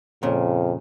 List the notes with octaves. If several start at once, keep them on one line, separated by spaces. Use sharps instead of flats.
F2 A#2 C#3